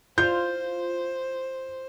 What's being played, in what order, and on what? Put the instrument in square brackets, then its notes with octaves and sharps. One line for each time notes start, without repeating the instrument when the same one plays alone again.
[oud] F4 [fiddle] C5 [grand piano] G6